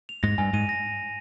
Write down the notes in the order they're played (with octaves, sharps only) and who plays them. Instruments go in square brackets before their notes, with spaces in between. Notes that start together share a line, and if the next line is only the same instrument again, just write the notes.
[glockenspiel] F7
[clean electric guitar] G#2 [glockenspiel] A#6
[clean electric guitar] G2 [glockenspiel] G#5
[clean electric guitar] G#2 [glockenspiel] D#7
[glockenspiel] A#6